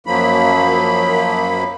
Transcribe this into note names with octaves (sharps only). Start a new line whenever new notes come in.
F#2 F3 F#3 A#3 B5